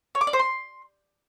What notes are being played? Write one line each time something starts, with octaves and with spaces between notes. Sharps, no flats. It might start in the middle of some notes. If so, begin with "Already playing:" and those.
C#5
D6
D5
C5
C6